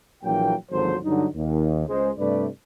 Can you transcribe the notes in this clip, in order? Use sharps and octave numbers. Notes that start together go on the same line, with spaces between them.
A#1 E3 F#3 A#3 G5
G#1 D2 F3 F#3 A4 C5
G2 D3 F#3 D#4
D#2
C#2 G#3 C5
G2 C3 A3 B4 D5